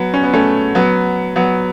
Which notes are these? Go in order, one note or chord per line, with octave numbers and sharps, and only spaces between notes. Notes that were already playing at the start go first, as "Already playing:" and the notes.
Already playing: F#3 B3
C#4
B3
A3 C#4
F#3 B3
F#3 B3